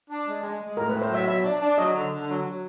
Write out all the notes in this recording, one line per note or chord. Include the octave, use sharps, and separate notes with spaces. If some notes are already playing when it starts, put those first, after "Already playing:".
D4
G#3
G#3
G#3
A2 A#4
A2 B4
C5
F#3 E5
B2 E5
D4
D4
F#3 D#5
D3
D3
F#3
F#3